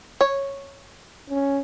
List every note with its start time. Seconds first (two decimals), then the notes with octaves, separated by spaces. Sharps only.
0.21 C#5
1.30 C#4